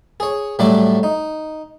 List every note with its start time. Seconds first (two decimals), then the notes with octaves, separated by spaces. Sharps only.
0.20 G#4 C#5
0.59 A2 F#3 G3 A3 E4 D5
1.03 D#4